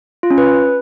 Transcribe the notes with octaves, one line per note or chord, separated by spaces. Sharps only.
F4
C#4
B4